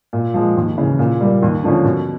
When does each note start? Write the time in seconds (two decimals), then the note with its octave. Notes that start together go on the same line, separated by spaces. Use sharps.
0.13 A#2
0.34 F3 G#3
0.57 D#2
0.78 C#3 E3
0.99 A#2
1.21 G3 A#3
1.43 D#2
1.64 D3 F3 A#3 C#4
1.84 B2